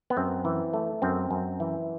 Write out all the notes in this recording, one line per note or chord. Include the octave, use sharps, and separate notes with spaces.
B3
F#2 C4
E3
A3
F#2 C4
F#2
E3